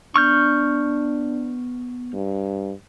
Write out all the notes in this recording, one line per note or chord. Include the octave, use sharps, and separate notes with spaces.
B3 D4 C#6 F6 G6
G2